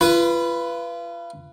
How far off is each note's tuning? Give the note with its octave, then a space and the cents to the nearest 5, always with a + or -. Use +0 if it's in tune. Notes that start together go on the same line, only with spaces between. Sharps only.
F4 -35 B4 +0